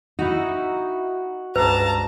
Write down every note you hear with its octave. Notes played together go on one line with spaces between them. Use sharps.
D#4 E4 F#4
C#2 G2 B4 A5 A#5